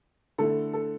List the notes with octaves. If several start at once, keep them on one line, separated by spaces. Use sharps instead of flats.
D3 A3 E4 A4
A4